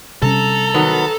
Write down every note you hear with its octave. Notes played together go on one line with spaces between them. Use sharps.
C3 G3 C#4 A4 A#5
D#3 F#3 B3